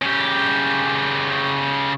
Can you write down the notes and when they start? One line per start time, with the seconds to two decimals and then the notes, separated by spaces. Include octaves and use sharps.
0.02 C#3 G4